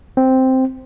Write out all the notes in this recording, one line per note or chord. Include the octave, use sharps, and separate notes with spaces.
C4